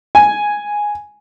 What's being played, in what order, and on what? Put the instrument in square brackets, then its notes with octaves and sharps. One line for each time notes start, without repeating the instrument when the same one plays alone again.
[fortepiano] G#5